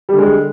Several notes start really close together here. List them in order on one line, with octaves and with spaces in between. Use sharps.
G3 D3 G#3